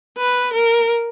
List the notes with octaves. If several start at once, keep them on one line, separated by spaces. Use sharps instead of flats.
B4
A#4